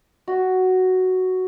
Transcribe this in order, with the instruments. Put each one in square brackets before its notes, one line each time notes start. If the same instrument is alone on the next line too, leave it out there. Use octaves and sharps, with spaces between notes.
[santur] F#4